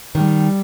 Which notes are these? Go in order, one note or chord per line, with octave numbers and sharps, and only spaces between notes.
D#3 G3